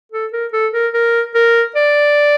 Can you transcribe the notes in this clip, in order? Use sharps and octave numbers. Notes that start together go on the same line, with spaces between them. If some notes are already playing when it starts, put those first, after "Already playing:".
A4
A#4
A4
A#4
A#4
A#4
D5